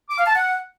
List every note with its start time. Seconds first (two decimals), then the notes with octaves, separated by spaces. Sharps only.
0.09 D6
0.18 F5
0.26 A5
0.34 F#5